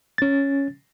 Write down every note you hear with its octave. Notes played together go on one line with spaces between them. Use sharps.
C#4 A6